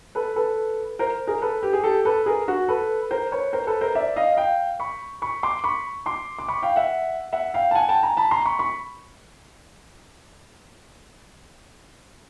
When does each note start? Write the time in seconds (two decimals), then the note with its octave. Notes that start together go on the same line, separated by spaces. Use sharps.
0.15 A4 B4
0.36 A4 B4
0.99 A#4 C5
1.27 G#4 A#4
1.42 A4 B4
1.63 G4
1.73 G#4
1.84 G4 A4
2.05 A4 B4
2.26 G#4 A#4
2.48 F#4
2.68 A4 B4
3.11 A#4 C5
3.32 B4 C#5
3.53 A#4 C5
3.67 A4 B4
3.81 A#4 C5
3.95 D5 E5
4.16 D#5 F5
4.37 F5 G5
4.80 B5 C#6
5.22 B5 C#6
5.43 C6 D6
5.64 B5 C#6
6.06 C6 D6
6.39 D6
6.48 B5 C#6
6.62 F5 G5
6.76 E5 F#5
7.33 E5 F#5
7.54 F5 G5
7.71 A5
7.75 F#5 G#5
7.89 G5 A5
8.03 G#5 A#5
8.17 A5 B5
8.31 A#5 C6
8.45 B5 C#6
8.59 B5 C#6